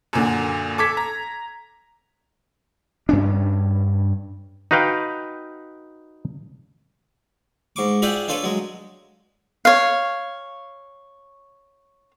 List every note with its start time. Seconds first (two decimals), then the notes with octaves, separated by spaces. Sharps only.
0.13 F#2 A#2 D3
0.78 A4 D6 G#6 B6
0.97 A#5
3.09 G2 C#4 D4
4.71 D#4 F#4 B4 F5 G5
7.76 G#2 C#6 D6
8.02 F4 G#4 D5 E5 F#5 G5
8.28 D4 F4 A4 B4 C#5
8.44 F#3 G#3
9.65 C#5 F5